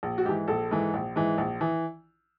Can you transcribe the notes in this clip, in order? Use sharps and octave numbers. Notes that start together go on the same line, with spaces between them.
A#1
F#4
G#2 E3 G4
A#1 A4
G#2 E3
A#1
G#2 E3
A#1
E3